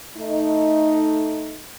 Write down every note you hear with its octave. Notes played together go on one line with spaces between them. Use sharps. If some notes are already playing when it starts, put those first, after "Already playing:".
A3 D#4